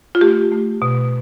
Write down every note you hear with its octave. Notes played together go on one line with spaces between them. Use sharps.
F4
A3 G4
A3
B2